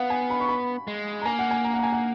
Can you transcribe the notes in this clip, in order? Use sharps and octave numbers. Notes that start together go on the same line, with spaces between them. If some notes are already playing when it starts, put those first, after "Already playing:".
Already playing: B3 F5 F#5
G#5
B5
C#6
B5
G#3
A#5
A#3 G#5
F#5
G#5
A#5
F#5
A#5
G#5
F#5